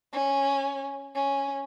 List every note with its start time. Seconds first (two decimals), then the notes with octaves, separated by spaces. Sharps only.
0.13 C#4
1.15 C#4